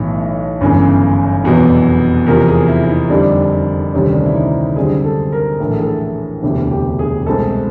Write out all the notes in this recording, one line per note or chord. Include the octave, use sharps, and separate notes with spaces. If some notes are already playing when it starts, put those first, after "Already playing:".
Already playing: B1 A2 E3
G1 F#2 C#3 E3
F1 E2 B2 F#3 B3
E2 C3 F3 A#4
G#4
E4
E4
D#4
F1 F2 D3 G3 D4
D2 C3 D#3 G3 C4 C#4
D4
E4
D#4
F#2 D3 G3 C4 G#4
A4
A#4
A#1 A2 E3 A#4
A4
G#4
A4
E1 D2 C3 E3 G4
G4
G#4
C2 B2 G#3 C4 A4